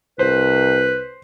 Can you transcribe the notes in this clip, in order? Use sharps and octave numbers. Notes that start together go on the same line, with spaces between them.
C2 B4 C5